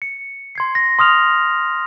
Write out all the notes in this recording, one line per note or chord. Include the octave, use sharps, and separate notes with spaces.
C#7
C6 G#6 C7
A#6
C6 D#6 F6 F7